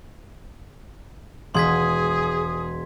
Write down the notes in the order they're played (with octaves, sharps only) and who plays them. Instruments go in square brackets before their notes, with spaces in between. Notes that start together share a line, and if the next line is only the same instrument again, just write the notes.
[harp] E1 [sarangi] G#4 [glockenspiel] C6 G#6 B6 [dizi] D#6